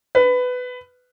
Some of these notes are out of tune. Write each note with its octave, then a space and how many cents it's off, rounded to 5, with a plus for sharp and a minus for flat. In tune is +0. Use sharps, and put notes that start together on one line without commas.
B4 +15